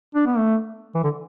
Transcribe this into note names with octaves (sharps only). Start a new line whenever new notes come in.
D4
B3
A3
E3
D3